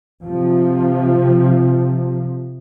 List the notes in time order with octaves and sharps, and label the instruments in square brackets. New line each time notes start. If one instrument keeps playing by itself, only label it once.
[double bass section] C3 F3